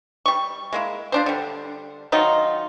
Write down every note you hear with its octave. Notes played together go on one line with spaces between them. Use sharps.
G3 C#6
G#3 A#3 E4
F3 D4 C5
D3 G3
D#3 F#3 D#4 F4